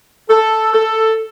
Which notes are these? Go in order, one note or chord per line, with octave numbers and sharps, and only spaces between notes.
A4
A4